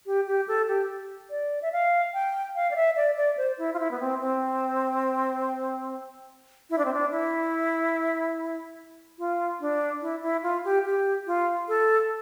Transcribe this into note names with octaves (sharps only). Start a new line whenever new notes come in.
G4
G4
A4
G4
D5
E5
F5
G5
F5
D5
E5
D5
D5
C5
E4
F4
E4
B3
C4
C4
E4
D4
C4
D4
E4
F4
D4
E4
E4
F4
G4
G4
F4
A4